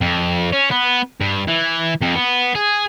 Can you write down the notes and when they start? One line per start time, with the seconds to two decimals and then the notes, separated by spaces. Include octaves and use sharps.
0.01 F2
0.52 C#4
0.71 B3
1.21 G2
1.48 E3
2.01 F2
2.15 B3
2.55 G#4